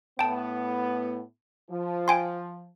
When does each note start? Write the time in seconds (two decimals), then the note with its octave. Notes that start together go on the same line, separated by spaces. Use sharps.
0.19 A2 B3 G5 A5
1.70 F3
2.08 G5 G#5 C6